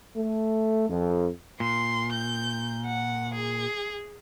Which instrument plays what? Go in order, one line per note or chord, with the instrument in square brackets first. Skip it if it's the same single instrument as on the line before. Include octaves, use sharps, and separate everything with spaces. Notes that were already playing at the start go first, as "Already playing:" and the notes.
[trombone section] A3
F2
[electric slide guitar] A#2 [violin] C6
[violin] G6
F#5
G#4